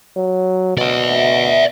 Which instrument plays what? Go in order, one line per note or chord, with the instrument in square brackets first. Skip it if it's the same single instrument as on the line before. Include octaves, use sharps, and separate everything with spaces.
[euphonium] F#3
[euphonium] B2 [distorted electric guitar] D5 E5